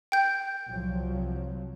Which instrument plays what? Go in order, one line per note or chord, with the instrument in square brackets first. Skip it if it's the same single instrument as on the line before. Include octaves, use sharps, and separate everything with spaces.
[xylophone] G5 G6
[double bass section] C2 F3 F#3